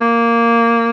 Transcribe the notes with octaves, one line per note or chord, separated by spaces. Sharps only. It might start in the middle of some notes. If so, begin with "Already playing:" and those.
A#3